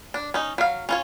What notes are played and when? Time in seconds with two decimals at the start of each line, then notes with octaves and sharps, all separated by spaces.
0.14 D4
0.34 C#4 D#4
0.58 F#3 F5
0.89 C#4 F4 C#5